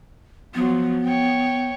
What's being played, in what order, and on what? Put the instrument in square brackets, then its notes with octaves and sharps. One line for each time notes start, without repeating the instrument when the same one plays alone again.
[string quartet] F3 F#3 [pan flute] B3
[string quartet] C#5 G5